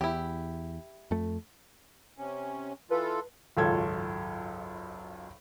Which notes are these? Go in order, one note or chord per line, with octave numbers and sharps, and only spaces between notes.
E2 E4 G4
F2 A3
C3 C#4
E3 F4 A4 B4
G#1 C#2 F#2 F4 A4 G#6